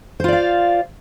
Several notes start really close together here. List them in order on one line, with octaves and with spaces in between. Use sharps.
C5 F4 D5 F5